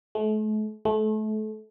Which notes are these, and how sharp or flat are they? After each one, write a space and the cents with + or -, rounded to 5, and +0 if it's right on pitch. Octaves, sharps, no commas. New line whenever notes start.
A3 -40
A3 -30